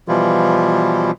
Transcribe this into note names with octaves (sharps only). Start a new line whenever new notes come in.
B2 E3 F3 G3 E4 F4